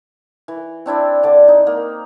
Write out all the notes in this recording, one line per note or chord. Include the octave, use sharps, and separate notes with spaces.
E3
C4 D4 E4 D5
D3 D5
D#4
A#3